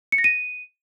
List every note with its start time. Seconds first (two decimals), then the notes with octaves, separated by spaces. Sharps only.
0.12 C#7
0.18 A#6
0.24 D#7